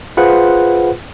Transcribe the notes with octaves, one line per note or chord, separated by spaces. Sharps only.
F4 G#4 B4 C5 F#5